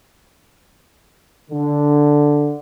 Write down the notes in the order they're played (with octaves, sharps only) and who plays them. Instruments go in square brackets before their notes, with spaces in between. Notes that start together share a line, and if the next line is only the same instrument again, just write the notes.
[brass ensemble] D3